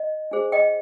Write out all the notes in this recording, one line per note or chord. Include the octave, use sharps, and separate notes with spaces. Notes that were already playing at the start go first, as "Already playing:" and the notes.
Already playing: D#5
D4 G#4 C5
D#5 G5